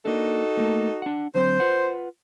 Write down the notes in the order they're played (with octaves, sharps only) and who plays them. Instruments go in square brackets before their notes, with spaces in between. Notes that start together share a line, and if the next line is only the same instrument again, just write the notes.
[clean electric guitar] A#3 D4 [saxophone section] D#4 F#4 A4
[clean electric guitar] A3 A#3
D4 F#5
[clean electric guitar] D3 F#3 C4 [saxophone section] C5
[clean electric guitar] F4 B4 F#5